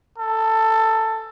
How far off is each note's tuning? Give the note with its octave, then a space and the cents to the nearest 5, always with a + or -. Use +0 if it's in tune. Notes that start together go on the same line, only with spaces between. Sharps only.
A4 +15